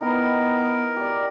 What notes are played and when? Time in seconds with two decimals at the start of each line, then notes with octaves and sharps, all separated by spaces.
0.01 B3 D#4 E4 A#4 G5
0.96 G4 D5